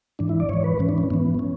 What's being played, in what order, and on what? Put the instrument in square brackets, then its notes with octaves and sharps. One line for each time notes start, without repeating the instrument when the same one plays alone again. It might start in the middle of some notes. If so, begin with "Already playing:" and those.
[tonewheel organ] G#2 E3 D4
E4
D5
G#2 E3 C#5
B4
G#2 E3 C#4
D4
C#4
G#2 E3 B3
C#4